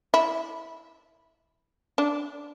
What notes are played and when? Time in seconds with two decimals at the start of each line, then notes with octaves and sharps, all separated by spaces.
0.14 E4
1.98 D4